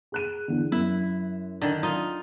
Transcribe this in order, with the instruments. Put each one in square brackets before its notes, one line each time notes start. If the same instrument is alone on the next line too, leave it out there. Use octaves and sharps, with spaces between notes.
[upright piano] G#4 F#6 D#7
E2 D3
[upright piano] F#2 [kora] E4
[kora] D3 D#3
D#4 F4